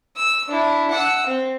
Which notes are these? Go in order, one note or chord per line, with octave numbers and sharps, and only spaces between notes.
E6
D4 E4
F#5 E6
C4